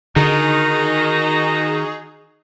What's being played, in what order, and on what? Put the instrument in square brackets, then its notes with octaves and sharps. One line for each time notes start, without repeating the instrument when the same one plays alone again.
[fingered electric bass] D3 [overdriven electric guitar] D#3 [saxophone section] D#4 F#4 [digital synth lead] G#4